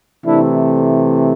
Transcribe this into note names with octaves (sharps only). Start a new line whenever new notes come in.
C3 E3 A3 D4 E4